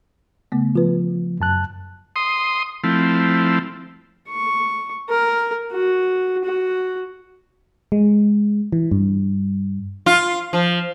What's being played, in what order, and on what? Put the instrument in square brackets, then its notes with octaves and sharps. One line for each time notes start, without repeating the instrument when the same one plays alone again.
[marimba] C#3 A3 B3
[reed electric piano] F3 [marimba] F4 B4
[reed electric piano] F#2 A5 F#6
[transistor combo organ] C6 D#6
F3 A3 C4 E4
[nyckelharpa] C#6
A#4
F#4
F#4
[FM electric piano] G#3
E3
G2
[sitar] F4
F3